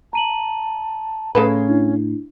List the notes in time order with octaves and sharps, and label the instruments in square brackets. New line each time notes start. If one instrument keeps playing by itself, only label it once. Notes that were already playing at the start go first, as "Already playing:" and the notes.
[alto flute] A5 [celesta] A#5 D#7 F#7
[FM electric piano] A2 A3 [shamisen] C#3 A4 B4 [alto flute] C#4
[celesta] D4 E4